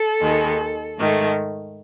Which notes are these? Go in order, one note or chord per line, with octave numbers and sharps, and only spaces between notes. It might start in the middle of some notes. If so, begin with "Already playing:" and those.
Already playing: A4
D#2 D#3 G#3
G#2 D#3 A3